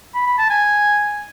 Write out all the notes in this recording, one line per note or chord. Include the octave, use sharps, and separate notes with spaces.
B5
B5
A5
G#5